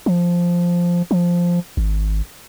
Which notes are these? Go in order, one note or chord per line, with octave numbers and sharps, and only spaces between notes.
F3
F3
G#1